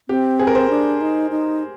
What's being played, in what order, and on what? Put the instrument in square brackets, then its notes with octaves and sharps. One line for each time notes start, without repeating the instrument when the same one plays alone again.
[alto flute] C4 [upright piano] G4
[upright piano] G#4
A#4
C5
[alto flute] D4
D#4
D#4